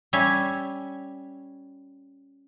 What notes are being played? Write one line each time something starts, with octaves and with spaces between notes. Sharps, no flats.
G3 C#4 E5 G#5